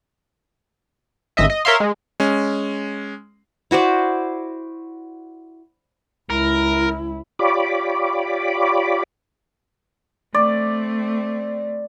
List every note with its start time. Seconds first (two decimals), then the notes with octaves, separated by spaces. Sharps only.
1.37 G#1 D#5 E5
1.50 D#5
1.65 A#4 C#5 E5 F5 C6
1.80 G#3
2.20 G#3 C#4
3.71 E4 F#4 C5 D5
6.30 C#2 E4 A#4
7.39 F4 G4 C#5 D5 B5 D6
10.34 A3 C4 D5